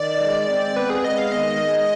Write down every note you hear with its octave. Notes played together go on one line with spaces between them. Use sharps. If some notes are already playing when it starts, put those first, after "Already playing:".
Already playing: D#3 D5
G#3
C4
B3 B4
G#4
G#3 D#5
F5
D#3 D#5
G#3